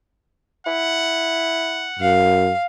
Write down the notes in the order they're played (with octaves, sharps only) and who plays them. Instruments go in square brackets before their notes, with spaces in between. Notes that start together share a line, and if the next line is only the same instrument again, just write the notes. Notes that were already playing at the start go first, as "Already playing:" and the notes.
[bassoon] E4 [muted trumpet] F#5
[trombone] F#2 [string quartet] F5